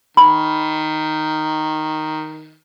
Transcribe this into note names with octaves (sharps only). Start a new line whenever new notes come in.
D#3 B5